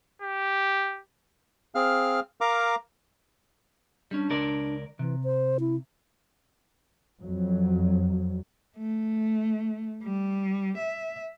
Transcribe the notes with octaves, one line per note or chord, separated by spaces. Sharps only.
G4
C4 G#4 F5 F6
A#4 F5 A#5 D6
G3 C#4 D4
C#2 A#4 D5
C3 E3
C5
E4
F2 F#3
A3
G3
E5